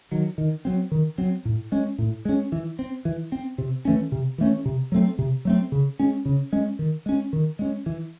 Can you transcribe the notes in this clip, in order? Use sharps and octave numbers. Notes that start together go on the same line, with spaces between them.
D#3 F#3
D#3
F#3 C4
D#3
F#3 C4
A2
G#3 C#4
A2
G#3 C#4
E3
C4
E3
C4
C3
E3 A3 C#4
C3
E3 A3 C#4
C3
F#3 A3 C4
C3
F#3 A3 C4
C#3
G#3 C#4
C#3
G#3 C#4
D#3
G#3 C#4
D#3
G#3 C#4
E3